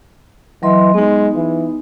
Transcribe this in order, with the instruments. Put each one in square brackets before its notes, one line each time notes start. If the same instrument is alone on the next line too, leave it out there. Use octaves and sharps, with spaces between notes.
[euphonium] E3 [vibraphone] F#3 D#5 C6
[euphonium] G#3 [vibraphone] B3 D#4
[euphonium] E3